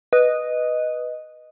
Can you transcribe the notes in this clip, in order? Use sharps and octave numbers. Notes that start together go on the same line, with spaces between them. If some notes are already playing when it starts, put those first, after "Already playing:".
B4 D#5